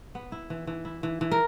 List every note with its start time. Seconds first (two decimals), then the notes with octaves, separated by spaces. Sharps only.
0.15 B3
0.32 E4
0.50 E3
0.67 E3
0.85 E4
1.03 E3
1.21 E3
1.31 A#4